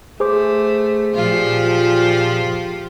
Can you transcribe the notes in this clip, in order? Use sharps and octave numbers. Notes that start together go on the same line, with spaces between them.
A3 G#4 C5 D6
A#2 F3 F4 G4